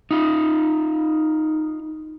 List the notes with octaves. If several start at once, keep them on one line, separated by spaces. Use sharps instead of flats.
D#4 F4